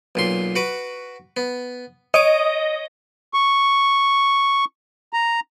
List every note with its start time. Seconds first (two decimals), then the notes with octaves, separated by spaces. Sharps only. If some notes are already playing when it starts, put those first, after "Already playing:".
0.15 B1 A#2 C6
0.56 F#4 B4 D6
1.37 B3
2.14 C#5 D#5 D6
3.34 C#6
5.13 A#5